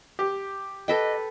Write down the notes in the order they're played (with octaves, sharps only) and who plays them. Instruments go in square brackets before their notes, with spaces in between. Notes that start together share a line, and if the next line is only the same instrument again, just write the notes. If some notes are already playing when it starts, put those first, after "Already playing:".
[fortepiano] G4
[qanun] A4 B4 G5 [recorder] D#5